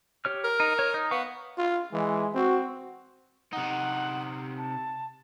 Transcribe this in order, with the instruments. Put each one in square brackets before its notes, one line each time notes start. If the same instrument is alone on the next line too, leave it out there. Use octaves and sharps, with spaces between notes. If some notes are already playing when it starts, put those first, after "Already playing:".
[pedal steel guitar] G4 C#5 F6
[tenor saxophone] A#4
[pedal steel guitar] D#4
C#5
D#4
[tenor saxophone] B3 [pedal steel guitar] F5 F#5 C#6
[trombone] F4
[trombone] E3 [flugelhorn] G#3
[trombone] C4 [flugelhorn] F#4
[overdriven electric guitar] C3 D#4 [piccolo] F#5
[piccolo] A5